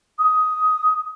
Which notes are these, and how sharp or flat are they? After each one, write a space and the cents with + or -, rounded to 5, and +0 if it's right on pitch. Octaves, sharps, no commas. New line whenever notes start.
D#6 +10